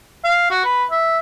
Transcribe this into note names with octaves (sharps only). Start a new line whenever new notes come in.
F5
F#4
B4
E5